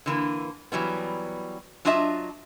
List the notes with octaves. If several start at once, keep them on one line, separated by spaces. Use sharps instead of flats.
D3 E3 A#3
E3 F#3 G3 B3
F#3 D4 F4 D#5 E5 A5